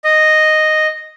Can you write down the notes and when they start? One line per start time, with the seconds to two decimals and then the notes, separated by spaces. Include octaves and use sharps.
0.04 D#5